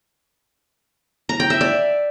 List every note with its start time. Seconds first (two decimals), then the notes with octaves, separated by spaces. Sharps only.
1.29 A#5
1.40 G5
1.50 E5
1.61 D5